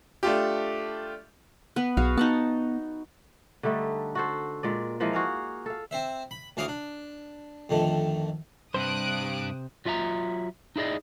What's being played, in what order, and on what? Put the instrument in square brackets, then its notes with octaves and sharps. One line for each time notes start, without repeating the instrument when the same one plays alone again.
[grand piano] A3 D4 F4 G4
[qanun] B3 B4
[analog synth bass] B1 [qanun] F#4 G#4 F5
[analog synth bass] B3 [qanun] D#4 F#5 A5
[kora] D3 G3 A3 D#4
F#4 A4 C5
A#2 G#3 D5
E3 F3 G#3 A#3
F#4 G#4 F5
A4 F5
[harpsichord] C4 C5 E5
B5
D2 E3 C#5 F5 D6 D#6
D4
F2 D3 D#3 A3
[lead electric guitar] G2 [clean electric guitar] C3 C5 [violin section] D#6 F#6 D7
[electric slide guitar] F#3 F4 E5 G#5 A#5
D#4 E4 G#4 D5 D#5